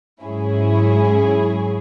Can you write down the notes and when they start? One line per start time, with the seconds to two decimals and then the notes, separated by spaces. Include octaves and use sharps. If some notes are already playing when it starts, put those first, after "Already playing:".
0.23 G#2 F#3 C#4 E4 G#4